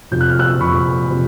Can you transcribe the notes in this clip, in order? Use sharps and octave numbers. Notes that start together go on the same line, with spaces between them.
F2 C3 F3 G6
F#6
F6
E6 F#6
F2 C3 F3 B5 C#6
C3 F3